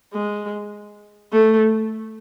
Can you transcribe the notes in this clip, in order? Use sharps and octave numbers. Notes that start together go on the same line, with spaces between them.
G#3
A3